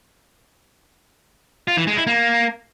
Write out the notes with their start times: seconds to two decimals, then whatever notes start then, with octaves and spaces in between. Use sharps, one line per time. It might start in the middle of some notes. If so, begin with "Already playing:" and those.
1.68 F4
1.77 E3
1.87 G#3
1.97 E4
2.07 A#3